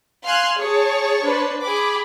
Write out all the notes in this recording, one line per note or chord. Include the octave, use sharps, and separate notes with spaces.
F5 G#5 C6 F6 F#6
G#4 C#5 A5
D4 B4 C5
G#4 B5 D6